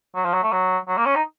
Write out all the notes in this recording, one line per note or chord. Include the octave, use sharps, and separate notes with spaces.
F#3
F3
F#3
A3
F#3
F#3
A#3
C#4
D#4